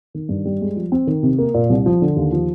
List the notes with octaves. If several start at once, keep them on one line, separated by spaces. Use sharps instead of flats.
D#3
G2
G3
G#3
F3
C4
D#3
C3
A#3
A#2
C2
F3
D3
D#2
F3